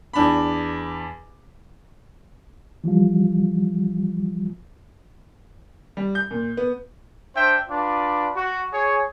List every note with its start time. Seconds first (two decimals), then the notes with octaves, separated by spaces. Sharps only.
0.13 E2 D4 B5
2.84 E3 F3 G3 F4
5.97 G3
6.15 G6
6.31 A#2
6.57 B3
7.36 D4 C5 E5 G5
7.69 D4 F4 B4 D5
8.36 F#4
8.73 G#4 C#5